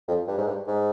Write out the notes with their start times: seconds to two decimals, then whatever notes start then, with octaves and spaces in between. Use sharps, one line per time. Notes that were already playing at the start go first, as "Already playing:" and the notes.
0.08 F2
0.28 G2
0.38 G#2
0.47 G2
0.67 G#2